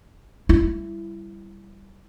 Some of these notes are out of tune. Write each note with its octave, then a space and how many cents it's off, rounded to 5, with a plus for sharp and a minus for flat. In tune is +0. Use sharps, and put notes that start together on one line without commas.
G3 +0 E4 +15